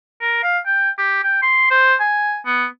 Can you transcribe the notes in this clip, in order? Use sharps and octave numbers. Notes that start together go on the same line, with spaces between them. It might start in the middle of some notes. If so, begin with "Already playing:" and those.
A#4
F5
G5
G4
G5
C6
C5
G#5
B3